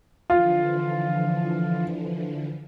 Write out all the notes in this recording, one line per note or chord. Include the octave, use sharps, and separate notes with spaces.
D3 E3 F3 F4